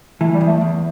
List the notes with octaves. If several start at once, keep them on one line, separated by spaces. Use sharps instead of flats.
E3 A3
G3
E2
A3
E2